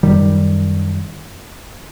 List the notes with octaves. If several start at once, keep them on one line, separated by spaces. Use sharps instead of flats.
F#2 D#3 G3